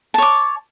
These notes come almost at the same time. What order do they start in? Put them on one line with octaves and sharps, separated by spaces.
A5 C#5 D6